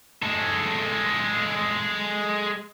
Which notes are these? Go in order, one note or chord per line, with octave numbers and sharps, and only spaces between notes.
G#3 A4